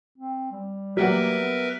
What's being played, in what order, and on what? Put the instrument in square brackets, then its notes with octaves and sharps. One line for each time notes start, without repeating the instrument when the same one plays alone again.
[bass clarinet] C4
G3
[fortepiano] F#3 G3 F#5 [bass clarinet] A#3 [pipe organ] A#4 B4 E5
[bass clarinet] B3